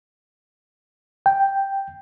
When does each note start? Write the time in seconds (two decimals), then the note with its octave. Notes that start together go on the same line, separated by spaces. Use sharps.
1.26 G5